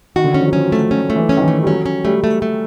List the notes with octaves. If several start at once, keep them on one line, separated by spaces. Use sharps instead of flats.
D#3 F#4
D3
D#3 C#4
F3
F#3
F3 C#4
F#3
A3
F#3 C#4
A3
E3
C#4
D#3
E3
A3
G3
F#3 C#4
C#4
G3 A3
A3
A3